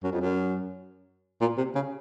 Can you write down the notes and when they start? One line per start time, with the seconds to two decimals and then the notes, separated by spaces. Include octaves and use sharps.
0.04 F#2
0.12 F2
0.21 F#2
1.41 A#2
1.57 C3
1.75 C#3